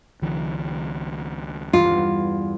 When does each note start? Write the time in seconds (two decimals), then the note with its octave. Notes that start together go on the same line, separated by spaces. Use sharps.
0.22 C#2 D#3 F3
1.73 E2 G2 F4